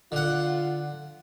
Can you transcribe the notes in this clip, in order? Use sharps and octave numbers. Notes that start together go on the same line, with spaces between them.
D3 F4 F#5